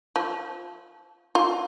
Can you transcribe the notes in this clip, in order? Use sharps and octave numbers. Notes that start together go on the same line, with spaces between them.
F3
F4